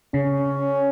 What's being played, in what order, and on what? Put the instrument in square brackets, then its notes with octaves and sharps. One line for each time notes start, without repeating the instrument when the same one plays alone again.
[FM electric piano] C#3 [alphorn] C#4